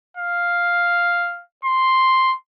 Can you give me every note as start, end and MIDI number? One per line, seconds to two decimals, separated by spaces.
0.17 1.42 77
1.65 2.35 84